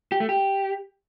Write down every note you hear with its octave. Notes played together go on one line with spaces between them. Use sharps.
G4
A3
G4